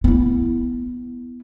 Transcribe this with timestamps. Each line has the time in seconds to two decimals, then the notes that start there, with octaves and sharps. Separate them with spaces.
0.04 B3 E4